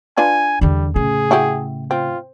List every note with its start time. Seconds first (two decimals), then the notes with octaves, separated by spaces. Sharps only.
0.17 D4 F4 B4 G#5
0.61 E2 D3 G3
0.96 A2 C#3 G#4
1.31 E4 F#4 G4
1.91 C4 F4